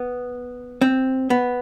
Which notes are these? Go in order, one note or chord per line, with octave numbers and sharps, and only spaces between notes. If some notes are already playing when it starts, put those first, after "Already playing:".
Already playing: B3
C4
B3